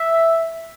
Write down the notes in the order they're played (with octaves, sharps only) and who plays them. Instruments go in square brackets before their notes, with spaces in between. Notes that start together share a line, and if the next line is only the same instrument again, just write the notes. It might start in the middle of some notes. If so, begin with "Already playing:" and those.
Already playing: [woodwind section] E5